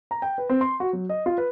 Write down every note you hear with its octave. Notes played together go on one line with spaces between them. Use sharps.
A#5
G5
B4
C4
C6
F#4
F#3
D#5
F4
B4